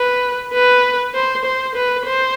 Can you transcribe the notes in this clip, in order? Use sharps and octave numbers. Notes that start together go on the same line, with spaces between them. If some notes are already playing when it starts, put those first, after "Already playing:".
Already playing: B4
B4
C5
C5
B4
C5